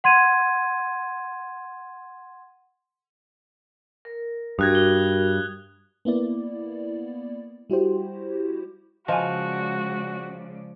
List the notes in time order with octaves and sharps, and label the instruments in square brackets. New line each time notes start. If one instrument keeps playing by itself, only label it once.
[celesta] F#5 C6 G#6 D#7
[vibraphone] A#4
[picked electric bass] G2 [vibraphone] F#4 A#4 [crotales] D#6 F#6 G#6
[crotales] G7
[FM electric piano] A#3 B3 E4 D5
G3 E4 F#4 G4 C5
[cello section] C#3 G#3 D5 [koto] F3 [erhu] F#4 [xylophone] D#5 G#5